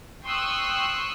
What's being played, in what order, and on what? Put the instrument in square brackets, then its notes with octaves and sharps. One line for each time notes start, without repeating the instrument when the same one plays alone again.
[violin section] G5 C6 C#6 D#6 E6 F#6